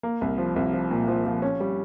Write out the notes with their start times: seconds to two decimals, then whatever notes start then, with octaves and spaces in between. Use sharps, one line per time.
0.03 A#3
0.21 C2
0.38 F3
0.56 C2
0.73 F3
0.91 A#2
1.08 F3
1.26 F3
1.42 C#4
1.60 G3